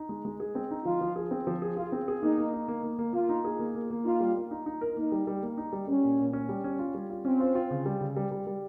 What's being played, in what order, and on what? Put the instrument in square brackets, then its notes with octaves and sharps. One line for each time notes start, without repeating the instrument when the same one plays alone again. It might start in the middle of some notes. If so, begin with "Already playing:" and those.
Already playing: [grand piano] D#4
G#3
G#3
G#4
C4
D#4
[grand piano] F3 [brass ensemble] F4
[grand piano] F3
G#4
C4
F3
G#4
[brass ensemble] F4 [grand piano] G#4
[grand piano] C4
G#4
[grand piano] A#3 [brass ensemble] D#4
[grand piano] A#3
D#4
A#3
A#3
A#3
[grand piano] A#3 [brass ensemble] F4
[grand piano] D#4
G#4
A#3
A#3
A#3
[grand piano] D#4 [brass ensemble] F4
[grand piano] G3
A#3
D#4
D#4
A#4
[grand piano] A#3 [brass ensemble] D#4
[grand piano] G3
G3
A#3
D#4
G3
[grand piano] G3 [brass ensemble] C#4
[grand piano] A#2
A#2
C#4
G3
C#4
F4
G3
F4
[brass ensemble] C4 [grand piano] C#4
[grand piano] F4
F4
C#3
G3
C#3
G3
G3
G3